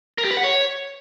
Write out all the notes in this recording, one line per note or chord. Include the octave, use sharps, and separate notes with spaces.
A#4
G4
B4
F#5
C#5